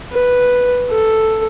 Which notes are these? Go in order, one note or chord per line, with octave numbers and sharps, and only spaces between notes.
B4
A4